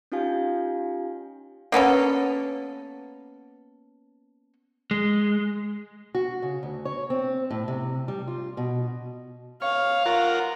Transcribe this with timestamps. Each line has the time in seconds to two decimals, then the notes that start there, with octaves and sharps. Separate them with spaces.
0.12 C#4 D#4 F4 G4 F5 G#5
1.72 A#3 B3 C#4 A4
4.91 G#3
6.15 F#4
6.42 C#3
6.63 D2
6.85 C#5
7.10 C4
7.51 A2
7.68 C3
8.08 G3
8.27 F4
8.57 B2
9.62 C#5 F5
10.06 F4 A#4 F#5